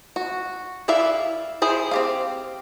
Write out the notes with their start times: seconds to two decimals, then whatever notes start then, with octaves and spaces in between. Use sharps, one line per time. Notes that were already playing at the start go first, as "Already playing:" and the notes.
0.16 F#4
0.88 E4 B4 D5 E5 F5
1.62 E4 G#4 C5
1.91 C4 G4 F5